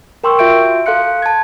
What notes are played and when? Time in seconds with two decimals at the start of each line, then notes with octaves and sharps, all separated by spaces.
0.24 A#4 G5 C6 C#6 E6
0.39 F4 F#4 E5 G6 D7
0.86 A4 F5 C6 F#6 C#7
1.22 A5 G#6